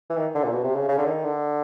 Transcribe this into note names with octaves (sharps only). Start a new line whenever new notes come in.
E3
D#3
D3
A#2
B2
C3
C#3
C#3
D3
D#3
D3